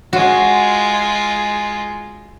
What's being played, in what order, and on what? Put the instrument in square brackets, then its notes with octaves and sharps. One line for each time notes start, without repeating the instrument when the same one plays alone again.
[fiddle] G#3 F4 [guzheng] F#4